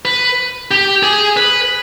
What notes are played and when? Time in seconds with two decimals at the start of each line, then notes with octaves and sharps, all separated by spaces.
0.05 B4
0.71 G4
1.03 G#4
1.37 B4